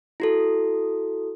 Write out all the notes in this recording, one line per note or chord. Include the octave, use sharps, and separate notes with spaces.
E4 F#4 A4